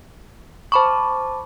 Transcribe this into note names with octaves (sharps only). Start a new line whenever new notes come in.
C5 A5 B5 C#6 D6